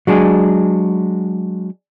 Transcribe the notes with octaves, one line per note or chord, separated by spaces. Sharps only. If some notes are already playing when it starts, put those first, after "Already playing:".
F#3 G#3 D4 G#4